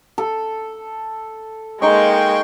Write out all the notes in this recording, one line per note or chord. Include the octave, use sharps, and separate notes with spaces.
A4
G#3 A#3 D#4 D#5 G5 C6 C#6